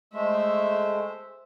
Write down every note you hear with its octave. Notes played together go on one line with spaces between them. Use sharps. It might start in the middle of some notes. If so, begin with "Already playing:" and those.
G#3 A3 C5 E5